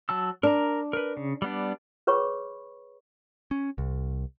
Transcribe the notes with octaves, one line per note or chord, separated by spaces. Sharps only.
F#3 A5 E6
D4 A#4 A#5
A#4 B4
C#3
G3 B3 D4
G#4 B4 C#5 B5 C#6
C#4
C2